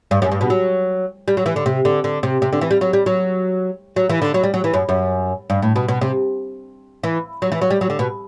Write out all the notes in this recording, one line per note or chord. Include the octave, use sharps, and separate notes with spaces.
G2
F#2
G2
B2
F#3
G3
F#3
E3
D3
C3
D3
D3
C3
C3
D3
E3
G3
F#3
G3
F#3
F#3
E3
D3
F#3
G3
F#3
E3
F#2
F#2
G2
A2
B2
B2
C3
E3
F#3
E3
F#3
G3
F#3
D3
B2